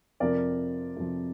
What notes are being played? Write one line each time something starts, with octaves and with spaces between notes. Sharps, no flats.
F2 C3 F3 A#4 D5
F2 C3 F3